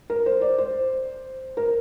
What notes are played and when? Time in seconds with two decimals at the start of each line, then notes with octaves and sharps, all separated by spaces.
0.10 A#4
0.26 C5
0.41 D5
0.58 C5
1.57 A#4